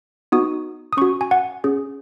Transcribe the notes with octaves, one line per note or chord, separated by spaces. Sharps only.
B3 D#4 F#4 D#6
D#6
C#4 F#4 C#6
G#5
F#5
C#4 G#4